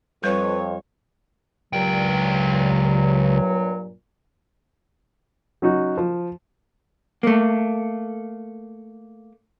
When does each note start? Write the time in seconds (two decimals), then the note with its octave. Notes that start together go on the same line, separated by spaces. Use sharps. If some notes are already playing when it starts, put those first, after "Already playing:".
0.24 F2 G3 B4 C#5
1.73 C#2 G2 A#2 F#3 G5
5.62 F#3 C#4 D#4 F#4
5.98 F3
7.23 A3 A#3